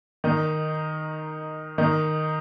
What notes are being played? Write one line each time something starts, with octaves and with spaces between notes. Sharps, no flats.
D#3 D#4
D#3 D#4